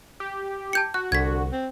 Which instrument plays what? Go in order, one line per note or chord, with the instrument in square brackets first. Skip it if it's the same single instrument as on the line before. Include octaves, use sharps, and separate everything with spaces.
[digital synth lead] G4
[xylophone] A5 G6 C#7
[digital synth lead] F#4 [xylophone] F#6
[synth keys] C2 [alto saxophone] D3 [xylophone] G#6 B6
[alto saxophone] C4